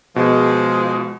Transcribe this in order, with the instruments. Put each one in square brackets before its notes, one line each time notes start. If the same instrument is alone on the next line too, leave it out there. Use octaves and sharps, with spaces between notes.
[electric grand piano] B2 [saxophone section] F3 G#3